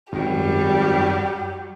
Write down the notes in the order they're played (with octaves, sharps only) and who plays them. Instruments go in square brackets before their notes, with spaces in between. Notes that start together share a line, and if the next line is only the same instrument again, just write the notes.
[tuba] G#1 [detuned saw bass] F#2 [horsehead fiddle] F#3 G3 [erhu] G4